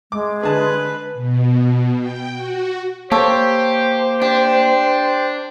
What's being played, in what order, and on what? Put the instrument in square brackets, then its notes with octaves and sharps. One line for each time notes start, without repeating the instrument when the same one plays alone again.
[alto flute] G#3 [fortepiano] D6
[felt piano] D3 [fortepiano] G#4 A5 [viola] B4
[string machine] B2
G5
F#4
[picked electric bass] A#3 [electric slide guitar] G4 [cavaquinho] A4 C#5 [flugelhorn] C5
[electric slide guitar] D4 [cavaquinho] G4